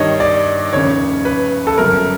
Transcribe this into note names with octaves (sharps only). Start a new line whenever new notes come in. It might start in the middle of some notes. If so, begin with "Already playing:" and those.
Already playing: G2 D#3 G3 C#5 D#5
D5
F1 D#2 C#3 C#5
B4
A4
G1 F#2 C#3 A#4